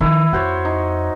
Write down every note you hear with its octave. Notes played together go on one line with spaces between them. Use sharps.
D#3 F3 E4
F2 F#4 C5 C#5
D#4